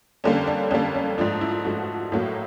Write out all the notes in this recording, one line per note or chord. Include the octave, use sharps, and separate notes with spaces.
F2 D3 G3 A#3 C#4
D4
F2 D3 G3 A#3 C#4
C#4
G#2 F3 A3 D4
E4
G#2 F3 A3 F#4
A2 F#3 A#3